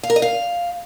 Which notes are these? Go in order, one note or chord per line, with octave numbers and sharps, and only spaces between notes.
F5
A#4
D#5
F5